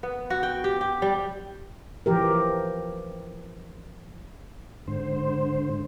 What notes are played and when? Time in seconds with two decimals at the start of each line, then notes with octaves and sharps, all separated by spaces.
0.03 B3
0.30 F#4
0.43 G5
0.64 G4
0.81 G4
1.02 G3
2.06 E3 F3 G4 A#4
4.87 G#2 D3 C5